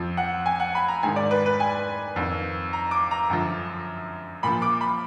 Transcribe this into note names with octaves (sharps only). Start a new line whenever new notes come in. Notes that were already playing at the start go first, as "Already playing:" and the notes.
Already playing: F2 F3
F#5
G#5
F#5
B5
A#5
G#2 D#3 G#5
D5
B4
B4
G#5
F2 D#3
A#5
D6
A#5
F#2 D3 F3
A#2 F3 B5
D6
B5